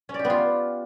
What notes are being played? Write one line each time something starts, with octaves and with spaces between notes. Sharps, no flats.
C#4
D5
G4
B3
F4